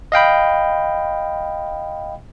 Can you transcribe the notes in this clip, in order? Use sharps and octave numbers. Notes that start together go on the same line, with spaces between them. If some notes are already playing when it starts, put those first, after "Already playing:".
D#5 F5 G5 B5